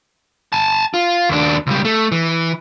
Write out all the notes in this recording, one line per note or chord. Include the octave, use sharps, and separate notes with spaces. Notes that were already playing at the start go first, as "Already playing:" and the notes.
G#5 A5
F4
D#2 D4
C#2 G3
A3
E3